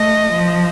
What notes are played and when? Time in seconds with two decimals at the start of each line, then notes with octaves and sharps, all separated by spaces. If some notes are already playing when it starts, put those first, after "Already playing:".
Already playing: A3 D#5
0.32 F3